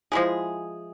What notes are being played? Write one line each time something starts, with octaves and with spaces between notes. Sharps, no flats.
F3 G#3 E4 G#4